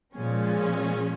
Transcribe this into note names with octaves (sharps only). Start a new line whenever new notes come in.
A#2 F3 G#3 C#4